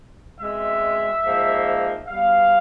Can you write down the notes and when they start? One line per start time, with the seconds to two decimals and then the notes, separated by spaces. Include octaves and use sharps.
0.40 B2 G#3 C4 E5
1.24 G#2 F3 A#3
2.07 B2 G3 B3 F5